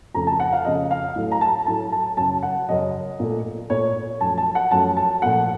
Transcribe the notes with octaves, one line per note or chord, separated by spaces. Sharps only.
F2 C#3 A3 A#5
A5
F#5
F5
F2 C#3 A3 D#5
F5
A2 F#3 A3
A#5
A5
A2 F#3 A3 A5
A5
F#2 C#3 F#3 A5
F#5
F#2 C#3 F#3 D#5
A#2 A3
A#2 A3 C#5
F#2 F3 A3 A5
A5
F#5
F#2 F3 A3 A5
A5
A#2 F3 A3 F#5